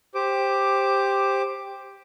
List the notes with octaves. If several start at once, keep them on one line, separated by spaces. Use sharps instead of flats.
G4 C5 D6